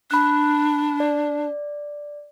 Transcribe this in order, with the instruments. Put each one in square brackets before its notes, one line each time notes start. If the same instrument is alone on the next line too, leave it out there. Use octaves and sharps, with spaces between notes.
[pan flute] D4 [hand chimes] B5 F#6
[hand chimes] D5